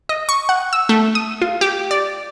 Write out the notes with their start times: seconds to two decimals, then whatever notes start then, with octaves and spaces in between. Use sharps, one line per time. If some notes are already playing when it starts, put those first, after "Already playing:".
0.09 D#5
0.29 C#6
0.49 F#5
0.73 E6
0.89 A3
1.15 D#6
1.42 F4
1.61 G4
1.91 D5